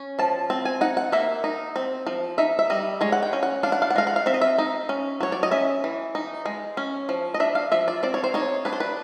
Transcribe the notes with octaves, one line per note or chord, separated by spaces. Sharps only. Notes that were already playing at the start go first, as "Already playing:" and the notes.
Already playing: C#4
F3 A5
C4
G#5
D#4 F#5
F#5
A#3 E5
D#4
C4
F3
D#4 E5
E5
G3 D#5
G#3 C#5
F#5
G5
C#4
F#5
D4 F5
F#5
F5
F#5
G#3 F5
F#5
F5
C4 E5
D#5
E5
D#4
C#4
F#3 C#5
D5
D#5
C#4 E5
E3
D#4
G#3
C#4
F3
D#5
D4 E5
F5
F3 E5
D5
C4 D5
C#5
C5
D#4 C#5
D4 B4
C5
B4